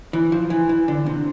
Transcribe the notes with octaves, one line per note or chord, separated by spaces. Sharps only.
E3
F3
E3
E3
D3
C3